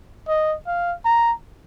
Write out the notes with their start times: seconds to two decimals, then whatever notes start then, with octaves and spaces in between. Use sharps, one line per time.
0.28 D#5
0.67 F5
1.05 A#5